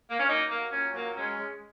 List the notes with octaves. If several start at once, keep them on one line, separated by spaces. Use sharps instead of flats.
A#3
C#4
F#3 A#3 D#4
F#3 A#3
A#2 C#4
F#3 A#3
G#3 C#4
G#3